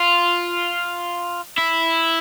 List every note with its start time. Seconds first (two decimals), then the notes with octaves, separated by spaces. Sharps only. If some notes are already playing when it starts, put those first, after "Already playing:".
Already playing: F4
1.58 E4